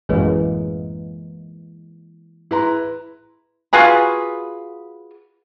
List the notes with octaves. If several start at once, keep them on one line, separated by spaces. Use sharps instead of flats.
A1 F#2 E3 G#3 A#3 G#4 B4 C#5
E4 G#4 B4 A#5 C6
F4 F#4 G#4 B4